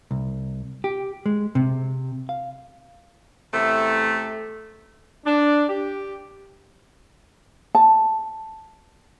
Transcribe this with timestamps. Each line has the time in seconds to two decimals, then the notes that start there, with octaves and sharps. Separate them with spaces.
0.11 C2
0.84 G4
1.26 G#3
1.55 C3
2.29 F5
3.53 E2 C3 A3
5.25 D4
5.68 G4
7.75 A5